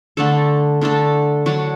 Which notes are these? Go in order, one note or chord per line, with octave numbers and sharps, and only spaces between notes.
D3 A3 D4 A4
D3 A3 D4 A4
F#3 D4 F#4